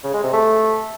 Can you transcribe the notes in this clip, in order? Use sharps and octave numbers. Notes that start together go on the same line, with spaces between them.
C#3
G#3
C3
A3